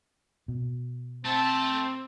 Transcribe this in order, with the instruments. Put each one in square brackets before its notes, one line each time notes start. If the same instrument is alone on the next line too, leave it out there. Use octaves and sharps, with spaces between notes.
[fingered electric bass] B2
[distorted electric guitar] A3 [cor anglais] C4 [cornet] A5